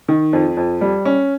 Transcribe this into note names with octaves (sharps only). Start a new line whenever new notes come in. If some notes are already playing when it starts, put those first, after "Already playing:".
D#3
F2
F2
G3
C#4